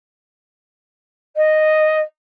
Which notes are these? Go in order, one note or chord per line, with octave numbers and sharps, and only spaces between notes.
D#5